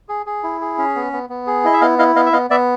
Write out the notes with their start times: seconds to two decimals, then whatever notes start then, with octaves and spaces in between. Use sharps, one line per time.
0.09 G#4
0.26 G#4
0.43 E4
0.61 G#4
0.78 C#4
0.95 B3
1.13 B3
1.30 B3
1.47 G#4
1.64 E4 D#5
1.73 E5
1.81 B3 D#5 F5
1.99 E4 D#5 F5
2.15 B3 D#5 F5
2.26 E5
2.33 B3 D#5 F5
2.50 B3 D5 E5